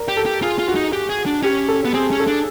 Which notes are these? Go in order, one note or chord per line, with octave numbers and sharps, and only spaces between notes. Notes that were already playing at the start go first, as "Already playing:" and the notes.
Already playing: A#4 D5
G4
A4
G4
F4 G#4
F4
F#4
D#4
G4
G#4
D4
C#4 G4
A4
B3
C4 G#4
C#4
A4
D4